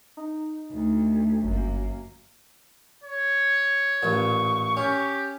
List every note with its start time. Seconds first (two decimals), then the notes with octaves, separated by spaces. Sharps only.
0.17 D#4
0.72 D2
1.44 G1 F#2 A#3
3.04 C#5
4.03 A1 A#2 C#6
4.77 C#4 G4